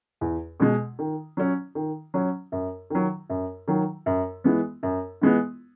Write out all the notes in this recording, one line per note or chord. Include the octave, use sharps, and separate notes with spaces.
E2
B2 G#3
D#3
F#3 C#4
D#3
F#3 C#4
F#2
D#3 F#3
F#2
D#3 F#3
F#2
E3 G#3 B3
F#2
E3 G#3 B3